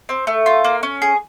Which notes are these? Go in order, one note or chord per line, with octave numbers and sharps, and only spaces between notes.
C4
A3
F4
A#3
C#4
G#4